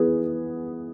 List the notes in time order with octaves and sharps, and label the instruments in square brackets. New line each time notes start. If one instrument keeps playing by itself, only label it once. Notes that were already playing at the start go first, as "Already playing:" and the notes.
Already playing: [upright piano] E3 B3 G#4 B4